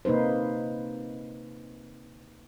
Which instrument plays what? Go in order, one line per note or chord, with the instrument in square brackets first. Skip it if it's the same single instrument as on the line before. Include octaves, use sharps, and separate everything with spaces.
[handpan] C3 A#3 D#4 B4 C5